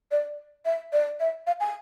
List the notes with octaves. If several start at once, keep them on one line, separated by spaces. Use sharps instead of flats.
D5
E5
D5
E5
F5
G#5